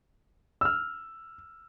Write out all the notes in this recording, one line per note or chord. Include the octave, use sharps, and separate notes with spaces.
E6 F6